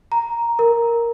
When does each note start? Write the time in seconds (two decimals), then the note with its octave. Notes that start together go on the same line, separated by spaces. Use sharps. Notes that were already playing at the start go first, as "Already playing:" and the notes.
0.12 A#5
0.59 A#4